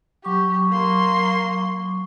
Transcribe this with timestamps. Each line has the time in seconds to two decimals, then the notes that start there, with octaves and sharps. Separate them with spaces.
0.25 F#3 G4 C#6 D6
0.69 A#3 C6